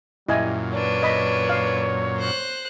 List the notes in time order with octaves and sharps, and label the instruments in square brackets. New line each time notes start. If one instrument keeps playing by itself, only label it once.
[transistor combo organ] F#2 A#2 [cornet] G3 [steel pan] E4 D#5 G#5
[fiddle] D4 B4 [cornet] C#5
[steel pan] D#5 B5
F5
[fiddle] C5 F#6